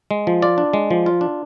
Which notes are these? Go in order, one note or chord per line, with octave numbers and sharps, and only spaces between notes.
G#3
F3
F4 D5
D4
G#3
F3
F4
D4